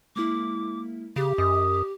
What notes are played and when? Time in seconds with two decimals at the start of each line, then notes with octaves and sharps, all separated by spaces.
0.16 G#3 A#3 E4 D6
1.16 C#3 G4
1.38 F#2 D#5 D#6